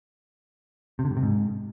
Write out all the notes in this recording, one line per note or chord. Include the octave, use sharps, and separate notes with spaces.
C3
D3
G2
C3
G#2